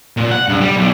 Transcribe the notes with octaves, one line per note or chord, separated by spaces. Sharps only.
A#2
F#5
G2
G3
B1